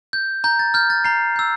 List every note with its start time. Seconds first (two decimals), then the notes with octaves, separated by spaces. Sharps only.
0.13 G6
0.44 A#5 G6
0.59 A6
0.74 F6 G6
0.90 A6
1.04 A#5 C7
1.36 E6 G6